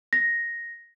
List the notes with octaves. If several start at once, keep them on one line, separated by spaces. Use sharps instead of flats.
A#6